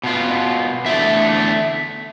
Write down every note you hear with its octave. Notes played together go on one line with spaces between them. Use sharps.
B2 B3 F4
E2 D3 A3 D4 E5